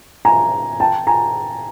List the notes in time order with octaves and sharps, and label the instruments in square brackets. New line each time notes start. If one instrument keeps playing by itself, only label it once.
[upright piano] G#5 A#5
G5 A5
G#5 A#5